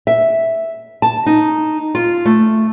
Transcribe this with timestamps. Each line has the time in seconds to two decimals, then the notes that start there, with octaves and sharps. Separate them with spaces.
0.07 E5
1.02 A5
1.26 D#4
1.95 F4
2.25 A3